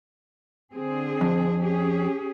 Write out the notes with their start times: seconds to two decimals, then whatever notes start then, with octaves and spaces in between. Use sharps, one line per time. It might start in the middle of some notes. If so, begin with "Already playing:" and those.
0.73 D3 C4 G#4
1.21 F2
1.62 C#4 G4 G#4